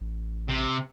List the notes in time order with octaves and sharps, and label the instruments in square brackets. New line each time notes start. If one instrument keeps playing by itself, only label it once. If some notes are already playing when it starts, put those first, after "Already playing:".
[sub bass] A1
[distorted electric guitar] C3